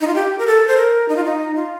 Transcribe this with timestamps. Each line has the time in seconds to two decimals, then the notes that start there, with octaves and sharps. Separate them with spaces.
0.01 D#4
0.07 F4
0.15 G4
0.38 A#4
0.47 A4
0.67 C5
0.77 A#4
1.09 D#4
1.16 F4
1.25 D#4
1.56 F4